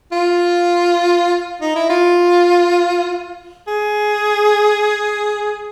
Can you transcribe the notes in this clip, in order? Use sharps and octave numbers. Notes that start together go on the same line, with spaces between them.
F4
D#4
E4
F4
G#4